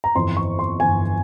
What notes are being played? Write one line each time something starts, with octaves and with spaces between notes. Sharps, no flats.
A#5
G1 F2 E3 C6
C#6
C6
G1 F2 E3 G#5